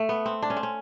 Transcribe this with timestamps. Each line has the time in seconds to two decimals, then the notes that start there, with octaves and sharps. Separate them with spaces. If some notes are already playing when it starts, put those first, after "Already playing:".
Already playing: A3
0.09 B3
0.26 C4
0.42 D4
0.50 C#4
0.57 C4
0.63 C#4